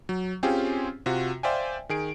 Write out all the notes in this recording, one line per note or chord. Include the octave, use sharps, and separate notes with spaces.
F#3
C4 C#4 F4 G4 G#4
C3 F4 F#4
C5 D5 E5 F5 G5 G#5
D#3 G#4 D7